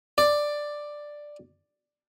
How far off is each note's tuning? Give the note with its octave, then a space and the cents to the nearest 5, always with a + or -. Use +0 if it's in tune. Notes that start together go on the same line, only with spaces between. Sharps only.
D5 +5